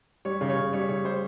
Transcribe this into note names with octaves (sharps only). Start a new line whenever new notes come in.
G3 C#5
C#3
C#5
C#3
G3 C#5
C#3 C#5
G3 C5